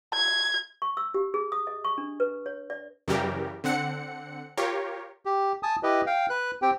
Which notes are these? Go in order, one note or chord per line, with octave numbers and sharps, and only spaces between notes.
G#6
C#6
E6
G4
G#4
D#6
D#5
C#6
D4
B4
C#5
D5
F#2 C#3 E3 G3 G4 A#4
D3 C4 F#5 C#7
F4 G4 A#4 C#5
G4
G#5 A5 D#6
E4 G4 B4 D#5
F5 G5
B4 F#6
C4 G4 G5